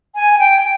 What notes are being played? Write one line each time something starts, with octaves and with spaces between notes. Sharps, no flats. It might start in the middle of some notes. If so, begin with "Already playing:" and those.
G#5
G#5
G5